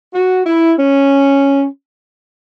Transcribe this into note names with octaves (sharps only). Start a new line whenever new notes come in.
F#4
E4
C#4